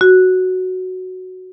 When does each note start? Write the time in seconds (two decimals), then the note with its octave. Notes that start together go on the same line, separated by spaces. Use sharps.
0.01 F#4